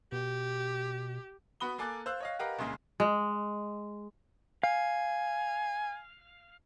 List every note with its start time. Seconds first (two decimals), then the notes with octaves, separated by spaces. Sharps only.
0.12 B2 G4
1.60 B3 F#4 B5 D#6 G7
1.78 A#3 A4 G#5 D6 F#6 A6
2.06 C5 F5 E6 F#6
2.20 C#5 D#5 F5
2.39 G4 A#4 B4 D#5 F5 F#5
2.59 C2 A#2 C#3 G#3
3.00 G#3
4.63 F5 G#5